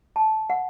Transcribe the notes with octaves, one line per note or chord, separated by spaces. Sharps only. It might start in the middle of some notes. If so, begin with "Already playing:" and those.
A5
F#5